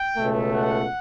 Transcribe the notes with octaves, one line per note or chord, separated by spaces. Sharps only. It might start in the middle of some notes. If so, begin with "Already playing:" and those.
Already playing: G5
C#2 B2 A3
F#5